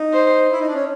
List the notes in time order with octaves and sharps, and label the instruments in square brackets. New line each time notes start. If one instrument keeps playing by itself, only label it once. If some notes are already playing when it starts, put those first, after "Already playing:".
Already playing: [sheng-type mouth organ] D#4
[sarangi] C5
[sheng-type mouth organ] E4
D#4
D4
C#4